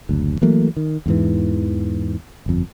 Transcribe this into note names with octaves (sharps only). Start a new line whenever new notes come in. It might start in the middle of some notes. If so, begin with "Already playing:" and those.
F#1 D2
E3 F#3 A3 A#3
D#3
E2 G#2 E3
G1 F2